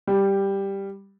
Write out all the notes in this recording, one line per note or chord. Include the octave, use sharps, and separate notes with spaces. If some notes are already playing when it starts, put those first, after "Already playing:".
G3